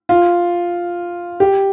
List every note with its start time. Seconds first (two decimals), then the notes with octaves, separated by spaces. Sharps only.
0.09 F4
1.40 G4